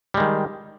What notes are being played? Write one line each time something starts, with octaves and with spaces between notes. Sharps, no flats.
D#3 G3 G#3